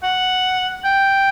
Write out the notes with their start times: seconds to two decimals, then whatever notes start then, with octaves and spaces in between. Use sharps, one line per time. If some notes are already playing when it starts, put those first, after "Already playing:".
0.03 F#5
0.85 G5